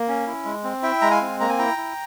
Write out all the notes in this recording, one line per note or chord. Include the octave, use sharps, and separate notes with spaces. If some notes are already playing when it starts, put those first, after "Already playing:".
Already playing: A#3
C#4
E4
G#3
C4
E4 E5 G5
G#3 A#5
F5 G#5
C4
A#3 A#5
G#5
E4 G5 A#5
E4